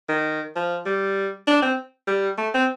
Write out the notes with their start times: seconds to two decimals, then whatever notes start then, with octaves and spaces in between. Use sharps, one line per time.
0.09 D#3
0.56 F3
0.86 G3
1.48 D4
1.62 C4
2.08 G3
2.38 A3
2.55 C4